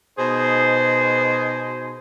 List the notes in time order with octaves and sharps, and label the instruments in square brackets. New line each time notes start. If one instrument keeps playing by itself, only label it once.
[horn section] B2 D#4 G#4 C5